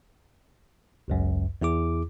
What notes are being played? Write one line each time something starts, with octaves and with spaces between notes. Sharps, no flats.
G#1 C#2 F#2
E2 E4 G#4 D6